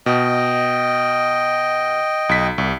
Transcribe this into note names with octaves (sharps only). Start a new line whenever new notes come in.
B2 D#5 G5
B1 B6
C2